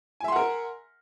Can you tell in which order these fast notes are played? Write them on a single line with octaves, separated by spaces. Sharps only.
G#5 E5 C6 F#5 A#4